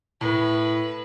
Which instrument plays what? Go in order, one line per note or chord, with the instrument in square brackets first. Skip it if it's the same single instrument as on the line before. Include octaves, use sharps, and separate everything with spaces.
[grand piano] A2 [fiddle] B4